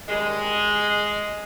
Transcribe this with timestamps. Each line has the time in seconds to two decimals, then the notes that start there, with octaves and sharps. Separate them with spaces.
0.08 F#2 D#3 G3 G#3